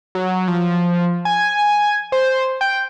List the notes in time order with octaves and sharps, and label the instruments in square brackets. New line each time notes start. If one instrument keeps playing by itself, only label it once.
[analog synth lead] F#3
F3
G#5
C5
G5